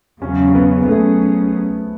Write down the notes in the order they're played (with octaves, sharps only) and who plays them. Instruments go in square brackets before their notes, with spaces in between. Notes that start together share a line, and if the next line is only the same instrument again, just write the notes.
[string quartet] E2 C#3 F#3 [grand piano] C#4
[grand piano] C#4
B3
B3
[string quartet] F#3 C#4 G#4 [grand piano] A3